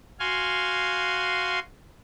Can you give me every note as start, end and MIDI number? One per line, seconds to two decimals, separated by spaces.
0.20 1.59 66
0.20 1.59 77
0.20 1.59 80
0.20 1.59 84